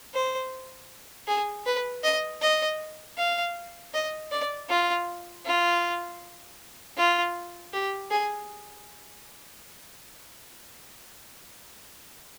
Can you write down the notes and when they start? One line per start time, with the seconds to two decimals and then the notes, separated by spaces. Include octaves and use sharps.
0.14 C5
1.27 G#4
1.66 B4
2.03 D#5
2.42 D#5
3.17 F5
3.94 D#5
4.32 D5
4.70 F4
5.45 F4
6.97 F4
7.73 G4
8.11 G#4